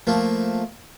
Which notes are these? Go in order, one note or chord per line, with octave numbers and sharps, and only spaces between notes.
F3 A3 A#3